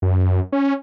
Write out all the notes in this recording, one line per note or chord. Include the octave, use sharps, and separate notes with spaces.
F#2
C#4